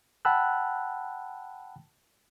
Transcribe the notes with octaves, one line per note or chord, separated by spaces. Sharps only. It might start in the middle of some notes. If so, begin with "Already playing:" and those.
F#5 G5 A5 B5 E6 F#6